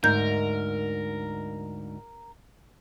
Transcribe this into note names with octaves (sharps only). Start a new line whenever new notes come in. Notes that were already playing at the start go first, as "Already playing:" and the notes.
D2 G#2 D#4 A#4 G6